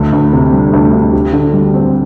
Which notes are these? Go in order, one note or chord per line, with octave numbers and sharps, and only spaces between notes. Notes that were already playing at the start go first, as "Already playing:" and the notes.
Already playing: D2 D3
D2
C3
G3
D2
D2
G4
D3
G3
C4